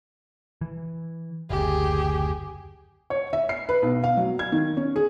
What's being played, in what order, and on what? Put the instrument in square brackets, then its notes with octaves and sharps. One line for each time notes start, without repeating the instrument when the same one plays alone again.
[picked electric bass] E3
[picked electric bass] F#1 D2 [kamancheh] G4 G#4
[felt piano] C#5
E5
C7
B4
B1
F5
F#3
G#6
D#3
C#4
G#4